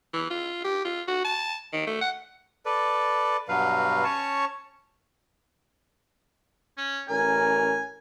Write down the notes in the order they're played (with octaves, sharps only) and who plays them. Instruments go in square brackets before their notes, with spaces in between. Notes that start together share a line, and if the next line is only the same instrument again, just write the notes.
[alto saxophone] E3
F4
G4
F4
F#4
A5
D#3
A3
F#5
[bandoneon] A4 B4 D5
G2 B2 F#3 B4 F5
C#4 C#5 A5 C#6
[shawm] C#4
[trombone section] A1 C#4 A#4 [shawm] G#5